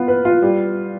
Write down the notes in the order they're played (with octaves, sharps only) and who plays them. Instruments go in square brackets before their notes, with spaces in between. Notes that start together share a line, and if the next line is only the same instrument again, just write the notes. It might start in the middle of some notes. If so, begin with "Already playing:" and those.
Already playing: [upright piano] B3 F4
B4
F4
G3